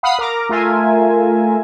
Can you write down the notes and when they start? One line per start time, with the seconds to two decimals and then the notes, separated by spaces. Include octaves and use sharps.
0.03 F5 F#5 B5 D#6 C7
0.19 A#4 A#5 D6
0.49 A3 F4 A#4 E5 G#5